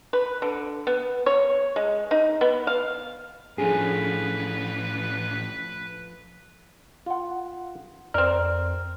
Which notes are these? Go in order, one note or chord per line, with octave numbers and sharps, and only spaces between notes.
B4
D3
B3
C#5
G#3
D#4
B3
F5
A2 F3 A3 C#4 D4 G#4 B4
F4 F#5
F2 C4 A#4 D5 F6